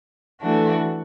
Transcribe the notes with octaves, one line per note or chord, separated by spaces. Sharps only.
E3 A3 D4 F#4